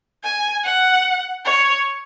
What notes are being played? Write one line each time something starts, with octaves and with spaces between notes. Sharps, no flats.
G#5
F#5
C#5